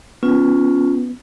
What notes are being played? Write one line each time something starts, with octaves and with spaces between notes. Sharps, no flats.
B3 C#4 F4